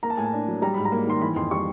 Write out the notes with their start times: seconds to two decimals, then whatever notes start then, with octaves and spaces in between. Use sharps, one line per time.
0.03 A#3 A#5
0.10 A5
0.17 A2 G#5
0.24 A5
0.33 D4
0.48 F#3
0.62 G3 A#5
0.74 G#2 B5
0.85 A#5
0.92 A#3
1.07 D#3 C6
1.21 E3 B5
1.36 F2 C6
1.51 G3 C#6